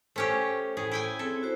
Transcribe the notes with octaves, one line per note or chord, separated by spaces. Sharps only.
A3 C#4 G4 C5
A2 G#4
E4 G5 G#5
C4 G#4 A4
E4 F#4 C5